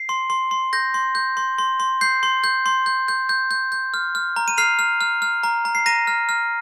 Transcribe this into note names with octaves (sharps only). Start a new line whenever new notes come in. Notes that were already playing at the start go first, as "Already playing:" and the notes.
Already playing: C7
C6
C6
C6
G6 A#6
C6
G6
C6
C6
C6
G6 C7
C6
G6
C6
G6
G6
G6
G6
G6
F6
F6
A#5
D#7
F6 C7 F7
F6
F6
F6
A#5
A#5
C7
A#5 A#6 D#7
F6
F6